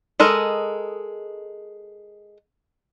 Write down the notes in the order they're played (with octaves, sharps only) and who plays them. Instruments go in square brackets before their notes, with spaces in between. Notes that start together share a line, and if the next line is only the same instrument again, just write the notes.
[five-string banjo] G#3 A4 A#4 D#5